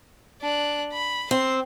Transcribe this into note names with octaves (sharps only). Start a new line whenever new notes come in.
D4 F#6
B5
C4 C7